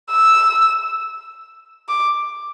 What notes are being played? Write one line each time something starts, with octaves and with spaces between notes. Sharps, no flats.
E6
D6